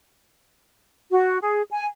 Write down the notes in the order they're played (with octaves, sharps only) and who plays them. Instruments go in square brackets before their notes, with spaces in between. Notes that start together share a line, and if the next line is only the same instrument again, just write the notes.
[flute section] F#4
G#4
G#5